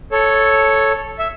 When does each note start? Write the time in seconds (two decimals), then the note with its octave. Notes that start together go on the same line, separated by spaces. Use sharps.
0.12 A4 C#5
1.19 E5